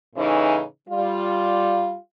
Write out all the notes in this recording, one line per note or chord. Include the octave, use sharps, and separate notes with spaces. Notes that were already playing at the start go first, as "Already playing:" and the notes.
A2 C#3 E3 C#4 D#4
G3 F4